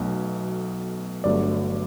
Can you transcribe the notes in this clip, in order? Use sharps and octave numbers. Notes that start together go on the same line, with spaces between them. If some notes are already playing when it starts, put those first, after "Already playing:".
Already playing: B1 B2 A3
G1 G2 F#3 A3 D5